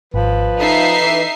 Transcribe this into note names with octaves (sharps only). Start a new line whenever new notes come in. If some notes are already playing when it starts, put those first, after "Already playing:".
G#1 F3 B4
D#4 A4 E5 A5 C7
E3